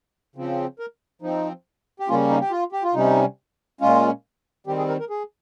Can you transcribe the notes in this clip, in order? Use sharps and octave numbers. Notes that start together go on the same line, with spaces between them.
C#3 F3 C4
A#4
F3 C4 D#4
G4
C#3 G3 A#3 C#4 F4
D#4
G4
F4
G4
F4
C3 G3 C#4 D#4
A#2 G#3 C#4 F4
D#3 G3 C4 G4
G#4
A#4
A#4
G#4